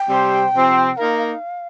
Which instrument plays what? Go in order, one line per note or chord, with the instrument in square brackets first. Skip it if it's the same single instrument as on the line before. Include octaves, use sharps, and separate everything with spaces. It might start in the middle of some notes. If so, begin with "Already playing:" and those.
Already playing: [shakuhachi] G5
[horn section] C3 G3 C4 G4 C5
C3 F3 C4
[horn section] A#3 D#4 A#4 [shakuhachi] F5